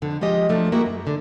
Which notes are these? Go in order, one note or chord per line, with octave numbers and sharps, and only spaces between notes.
F2 D3
F3 G#3 G4 D#5
F3 F#3 A3 D4
G3 A#3 E4 F#4 G#4
F#2
D3